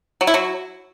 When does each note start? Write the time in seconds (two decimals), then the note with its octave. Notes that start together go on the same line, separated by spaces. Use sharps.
0.21 F#3
0.27 E4
0.34 F#3